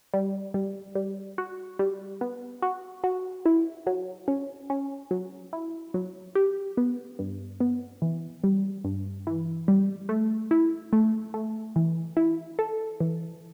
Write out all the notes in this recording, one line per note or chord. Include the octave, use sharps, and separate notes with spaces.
G3
G3
G3
F#4
G3
B3
F#4
F#4
E4
F#3
C#4
C#4
F#3
E4
F#3
G4
B3
G2
B3
E3
G3
G2
E3
G3
A3
E4
A3
A3
E3
E4
A4
E3